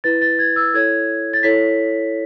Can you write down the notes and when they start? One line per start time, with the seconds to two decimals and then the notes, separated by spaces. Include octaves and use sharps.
0.04 E4 B4 A6
0.21 A6
0.39 G#6
0.56 E6
0.74 E4 A4 C#5 G#6
1.33 A6
1.43 E4 A4 C#5 B6